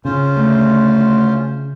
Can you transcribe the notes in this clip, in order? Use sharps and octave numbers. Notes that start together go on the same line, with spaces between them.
C#3 C#4 F4 C5
D2 A3